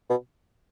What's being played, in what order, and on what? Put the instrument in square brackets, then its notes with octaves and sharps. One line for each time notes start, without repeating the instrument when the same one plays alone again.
[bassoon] B2